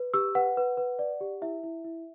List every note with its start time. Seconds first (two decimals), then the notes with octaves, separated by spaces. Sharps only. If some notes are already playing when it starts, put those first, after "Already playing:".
Already playing: B4
0.14 G4 E6
0.35 B4 F#5
0.57 B4
0.77 B4
0.99 D5
1.21 G4
1.42 E4 E5
1.64 E4
1.85 E4